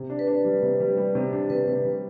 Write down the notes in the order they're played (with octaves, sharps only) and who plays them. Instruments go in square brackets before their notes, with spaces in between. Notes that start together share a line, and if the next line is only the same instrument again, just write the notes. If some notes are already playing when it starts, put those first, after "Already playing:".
Already playing: [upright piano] C3
D4
[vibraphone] B4
[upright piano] D4
G3
C3
G3
G3
C3
D4
[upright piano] C3 [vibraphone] B4
[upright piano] C3
G3